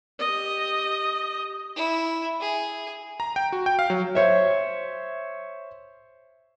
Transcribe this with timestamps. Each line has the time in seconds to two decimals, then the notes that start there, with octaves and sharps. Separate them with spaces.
0.19 G4 D#5
1.76 E4
2.41 G#4
3.20 A#5
3.36 G5
3.52 F#4
3.66 G5
3.79 F5
3.90 F#3
4.15 C5 C#5 E5